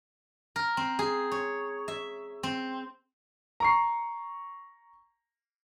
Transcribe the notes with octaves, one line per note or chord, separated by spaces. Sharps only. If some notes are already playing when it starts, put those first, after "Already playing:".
A#4
C4
G#4
C#5
E5
C4
A#5 C#6 C7